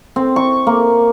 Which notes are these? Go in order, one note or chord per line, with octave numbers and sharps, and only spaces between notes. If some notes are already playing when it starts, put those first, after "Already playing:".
C4
C#6
A#3